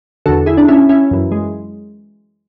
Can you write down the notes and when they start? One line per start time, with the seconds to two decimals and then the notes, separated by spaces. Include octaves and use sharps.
0.26 E2 D3 F#4 A4
0.46 E4 G#4
0.57 D4
0.68 C#4 E4
0.89 C#4 E4
1.11 F#2 E3
1.32 G#3